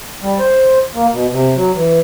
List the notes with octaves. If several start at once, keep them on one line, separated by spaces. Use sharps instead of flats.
G3
C5
A#3
B2
C3
F#3
E3